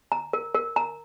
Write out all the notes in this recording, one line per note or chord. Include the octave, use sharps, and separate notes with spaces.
A#5
A#4
A#4
A#5